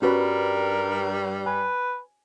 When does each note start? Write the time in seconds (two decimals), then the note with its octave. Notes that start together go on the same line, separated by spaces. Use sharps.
0.02 G2 G3 C#4 F#4 A#4 B4
1.46 B4 G#5